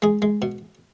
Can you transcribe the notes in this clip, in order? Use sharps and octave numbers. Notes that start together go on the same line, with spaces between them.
G#3 G#4
G#3
B2